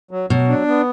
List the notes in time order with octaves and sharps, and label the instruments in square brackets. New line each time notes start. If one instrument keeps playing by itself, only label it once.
[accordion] F#3
[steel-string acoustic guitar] B2 [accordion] F#3
[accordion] D4
B3